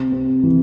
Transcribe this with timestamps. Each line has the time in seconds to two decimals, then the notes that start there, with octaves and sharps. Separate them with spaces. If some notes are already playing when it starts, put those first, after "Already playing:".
Already playing: C3
0.12 C4
0.43 E3